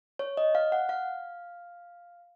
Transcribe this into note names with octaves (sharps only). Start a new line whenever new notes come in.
C#5
D#5
F5
F#5
F5